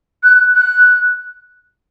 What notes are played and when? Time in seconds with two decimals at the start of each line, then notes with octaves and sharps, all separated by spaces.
0.23 F#6
0.55 F#6